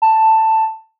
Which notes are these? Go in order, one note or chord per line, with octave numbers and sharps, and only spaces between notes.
A5